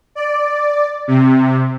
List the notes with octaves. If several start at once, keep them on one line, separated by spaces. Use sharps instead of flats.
D5
C3